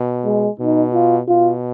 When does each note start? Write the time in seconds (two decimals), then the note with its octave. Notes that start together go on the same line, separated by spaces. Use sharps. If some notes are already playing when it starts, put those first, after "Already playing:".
Already playing: B2
0.25 G#3
0.60 B2 D#4
0.94 F4
1.28 B2 F4